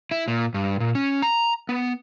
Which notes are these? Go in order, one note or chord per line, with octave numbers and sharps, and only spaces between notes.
E4
A#2
G2
A#2
C#4
A#5
B3